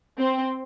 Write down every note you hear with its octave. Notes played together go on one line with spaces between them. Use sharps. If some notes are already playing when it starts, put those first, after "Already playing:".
C4